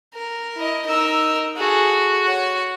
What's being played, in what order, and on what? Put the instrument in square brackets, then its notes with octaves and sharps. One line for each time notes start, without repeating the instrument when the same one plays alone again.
[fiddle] A#4
[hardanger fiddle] E4 D#5
[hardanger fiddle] D#4 D#5 [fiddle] A#4 E6
[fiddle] F#4 [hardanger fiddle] G#4 A4
[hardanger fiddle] C#5 F#5